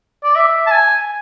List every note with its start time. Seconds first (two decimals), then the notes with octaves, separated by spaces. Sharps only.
0.24 D5
0.35 E5
0.67 A5
0.71 G#5